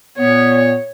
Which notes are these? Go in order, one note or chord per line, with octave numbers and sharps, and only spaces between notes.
A#2 B3 C#5